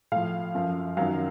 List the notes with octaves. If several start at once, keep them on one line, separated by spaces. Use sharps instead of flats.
A2 F3 F5
F#2 F3
F#2 D#3 F#3 F5